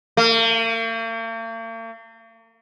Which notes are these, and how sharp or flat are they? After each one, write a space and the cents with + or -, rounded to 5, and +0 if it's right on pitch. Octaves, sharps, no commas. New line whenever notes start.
A#3 -45